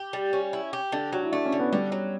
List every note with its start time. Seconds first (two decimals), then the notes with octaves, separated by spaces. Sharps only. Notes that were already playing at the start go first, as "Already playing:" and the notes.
Already playing: G4
0.13 G3
0.33 C#4
0.53 E4
0.73 G4
0.92 D3 D4
1.13 F#3 F#4
1.23 E4
1.32 A3 D4
1.46 C#4
1.52 D3
1.59 B3
1.72 D3 G3
1.92 F#3